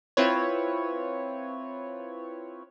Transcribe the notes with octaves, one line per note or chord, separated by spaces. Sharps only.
C4 E4 F4 B4 C#5